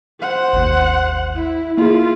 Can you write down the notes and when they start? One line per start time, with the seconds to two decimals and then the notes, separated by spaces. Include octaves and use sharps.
0.20 C5 F#5
0.53 G#1 D#2
1.35 E4
1.77 A#3 E4 F4 G#4